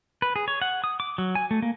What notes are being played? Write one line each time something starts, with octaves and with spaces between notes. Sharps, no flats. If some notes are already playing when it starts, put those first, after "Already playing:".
B4
G#4
C#5
F#5
D#6
D6
F#3
G#5
A3
A#3